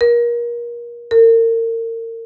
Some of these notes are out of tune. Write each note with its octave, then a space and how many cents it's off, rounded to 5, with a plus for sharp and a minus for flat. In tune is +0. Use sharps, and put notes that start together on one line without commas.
A#4 +30
A#4 -35